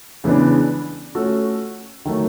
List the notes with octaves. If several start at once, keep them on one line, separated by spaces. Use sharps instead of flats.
C#3 E3 G#3 B3 D4
A3 C#4 F#4 A4
D#3 F#3 A3